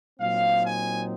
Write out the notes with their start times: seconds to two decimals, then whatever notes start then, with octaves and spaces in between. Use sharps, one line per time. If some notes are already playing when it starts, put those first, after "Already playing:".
0.20 A#2 F#3 C4 D#4 F5
0.63 G#5